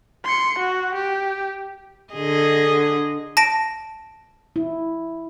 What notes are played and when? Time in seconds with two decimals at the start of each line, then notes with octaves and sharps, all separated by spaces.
0.25 C6 C#7
0.59 F#4
0.95 G4
2.13 D3 G#4 D#5
3.37 A5 A#6 D7
4.56 E4